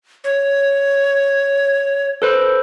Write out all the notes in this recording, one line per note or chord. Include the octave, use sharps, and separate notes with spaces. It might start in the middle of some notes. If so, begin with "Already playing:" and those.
C#5
A4 B4 C5